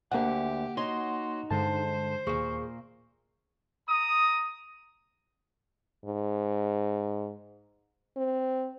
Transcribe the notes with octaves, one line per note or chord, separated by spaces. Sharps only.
D2 D3 A#3 G4 E5 F#5
D#4 F#4 C#5 C6
G2 D3 G#3 C5 A5
D#2 A#2 A#3 G#4 C#6
A#5 D#6
G#2
C4